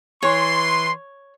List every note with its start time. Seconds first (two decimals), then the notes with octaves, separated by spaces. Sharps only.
0.23 E3 C#5 C6